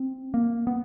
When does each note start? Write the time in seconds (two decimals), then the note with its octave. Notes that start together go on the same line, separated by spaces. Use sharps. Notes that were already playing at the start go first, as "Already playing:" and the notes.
Already playing: C4
0.34 A#3
0.67 B3